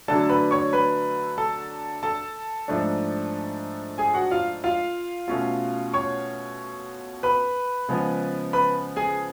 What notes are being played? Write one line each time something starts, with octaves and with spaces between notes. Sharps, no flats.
D3 F#3 A3 D4 A4 A5
B4 B5
C#5 C#6
B4 B5
A4 A5
A4 A5
G#2 F3 A3 D4
G#4 G#5
F#4 F#5
F4 F5
F4 F5
B2 A3 C#4 F4
C#5 C#6
B4 B5
C#3 F3 G#3 B3
B4 B5
G#4 G#5